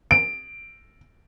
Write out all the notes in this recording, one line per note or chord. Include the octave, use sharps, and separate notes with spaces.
D7